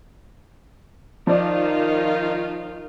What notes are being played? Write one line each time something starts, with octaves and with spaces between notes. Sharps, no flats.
D#3 F3 D#4 F4 D5